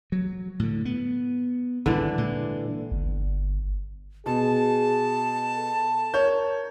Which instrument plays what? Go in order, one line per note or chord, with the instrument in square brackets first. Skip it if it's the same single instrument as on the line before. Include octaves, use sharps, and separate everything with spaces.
[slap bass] F#3
A2 D3
B3
[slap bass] G#1 G3 [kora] D3 E3 D4
[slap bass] A#2 G#3
[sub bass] G1
[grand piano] B2 [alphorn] G#4 [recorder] A5
[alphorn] A4
[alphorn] A#4 [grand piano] C#5 G6